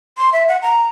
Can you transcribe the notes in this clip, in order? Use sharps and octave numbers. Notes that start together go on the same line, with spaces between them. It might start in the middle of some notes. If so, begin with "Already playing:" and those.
C6
E5
F#5
A#5